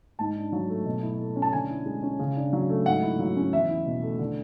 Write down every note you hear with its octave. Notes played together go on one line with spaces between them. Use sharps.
G#2 A5
D4
F#3
A3
B2
E4
A3
C#4
A5
D3 G#5
E4
G#3
C#4
C#3
D4
F#3
A3
G#2 F#5
E4
F#3
C#4
E2 E5
E4
B2
A3
D3